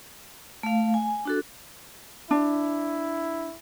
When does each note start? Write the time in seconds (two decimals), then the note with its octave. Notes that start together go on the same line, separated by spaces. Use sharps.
0.63 A3 F5
0.94 G#5
1.25 D4 F#4 A4
2.31 D4 E4